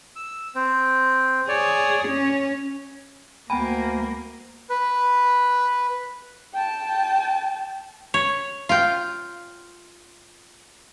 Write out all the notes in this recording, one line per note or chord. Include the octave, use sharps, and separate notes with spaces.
E6
C4
G#4 C#5 D5
C#4 C#5
D2 A#3 B3 G5 G#5 B5
B4
G5 A5
C#5
F4 G5